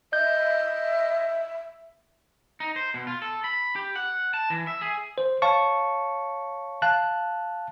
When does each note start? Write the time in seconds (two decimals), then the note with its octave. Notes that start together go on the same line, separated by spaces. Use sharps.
0.13 D#5 E5 G6
2.60 D#4
2.76 C5
2.94 B2
3.07 F4
3.22 A4
3.44 B5
3.76 G4
3.96 F#5
4.34 A5
4.50 E3
4.67 E5
4.81 G#4
5.18 C5
5.42 C#5 F5 A5 C#6
6.82 F5 A5 F#6